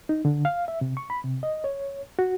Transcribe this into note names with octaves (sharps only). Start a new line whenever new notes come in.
D#4
D3
F5
E5
C3
C#6
B5
C3
D#5
C#5
F#4